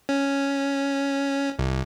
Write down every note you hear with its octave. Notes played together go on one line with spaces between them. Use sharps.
C#4
C2